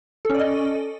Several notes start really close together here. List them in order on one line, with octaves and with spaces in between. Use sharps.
A4 C#4 D5 D#5